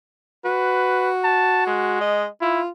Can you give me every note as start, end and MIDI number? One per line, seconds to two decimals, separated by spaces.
0.45 1.97 66
0.45 1.10 71
1.24 1.65 81
1.67 2.27 56
2.01 2.27 75
2.41 2.61 64
2.41 2.69 65